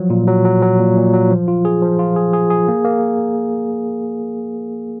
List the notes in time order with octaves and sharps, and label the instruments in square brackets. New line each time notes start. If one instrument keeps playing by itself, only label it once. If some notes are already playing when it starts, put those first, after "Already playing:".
Already playing: [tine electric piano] F3 F#3
A#2
F#3
F#3
F#3
A#2
A#2
F#3
F3
F4
G#4
F3
F4
G#4
G#4
G#4
A#3
A#3